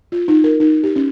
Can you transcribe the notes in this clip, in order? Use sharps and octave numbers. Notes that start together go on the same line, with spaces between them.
F4
D#4
A#4
D#4
G4
C#4